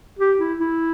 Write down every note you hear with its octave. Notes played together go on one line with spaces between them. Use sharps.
G4
E4
E4